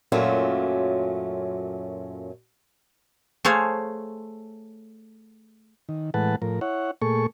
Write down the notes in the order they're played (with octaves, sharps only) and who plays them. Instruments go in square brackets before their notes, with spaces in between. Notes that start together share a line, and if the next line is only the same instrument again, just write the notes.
[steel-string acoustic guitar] F#2 A#2 F#3 A3 C#4 F4
[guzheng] A3 G#4 C5 C#5 F5
[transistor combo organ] D#3
A2 E3 G#3 B4 F#5 A5
A2 F3 A#4
E4 C#5 F#5
A#2 A3 G#4 A4 C#6